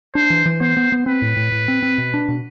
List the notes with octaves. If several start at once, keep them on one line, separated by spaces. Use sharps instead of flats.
D4 C5
E3
E3
B3 C5
B3
B3
C4 B4
A2
A2
A2
C4
C4
B2
D4
B2